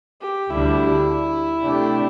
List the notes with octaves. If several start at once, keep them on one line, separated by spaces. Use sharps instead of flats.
G4
D2 D3 G3 D4 E4
C3 A3 D4 G4